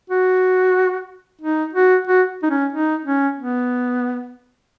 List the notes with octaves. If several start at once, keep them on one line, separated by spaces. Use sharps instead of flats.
F#4
D#4
F#4
F#4
D#4
C#4
D#4
C#4
B3